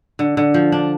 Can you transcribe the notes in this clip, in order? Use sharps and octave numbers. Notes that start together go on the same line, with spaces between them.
D3
D3
F3
D4